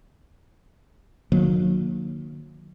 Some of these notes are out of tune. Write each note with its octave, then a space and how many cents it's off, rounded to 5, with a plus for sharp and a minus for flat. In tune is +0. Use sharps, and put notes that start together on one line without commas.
D#3 -40 F#3 -35 A#3 +0